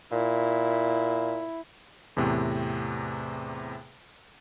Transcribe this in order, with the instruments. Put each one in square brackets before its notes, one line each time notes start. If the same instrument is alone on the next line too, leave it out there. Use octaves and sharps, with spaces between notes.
[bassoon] A#2 [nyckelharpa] E4
[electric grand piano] E2 A2 C3 C4